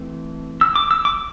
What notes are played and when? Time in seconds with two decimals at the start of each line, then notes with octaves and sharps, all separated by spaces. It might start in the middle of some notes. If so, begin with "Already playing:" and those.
Already playing: E3 A3 C4
0.61 E6
0.76 D6
0.91 E6
1.05 D6